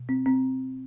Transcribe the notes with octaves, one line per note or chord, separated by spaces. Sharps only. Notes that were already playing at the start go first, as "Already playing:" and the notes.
Already playing: B2
C4
C4